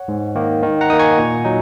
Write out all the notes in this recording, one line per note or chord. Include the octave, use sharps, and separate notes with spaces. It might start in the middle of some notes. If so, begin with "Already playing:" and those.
Already playing: C#5 F#5
G#2
D#3 A#3
D#3
F#5 A#5
A#3 D#4 D#6
G#5 C#6
A#2
F#3 D#4